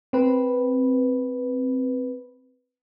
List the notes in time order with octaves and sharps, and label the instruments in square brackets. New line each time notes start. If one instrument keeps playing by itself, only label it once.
[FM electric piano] C4 B4